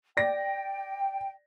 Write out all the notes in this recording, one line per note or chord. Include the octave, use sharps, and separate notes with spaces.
D5 G5 A#6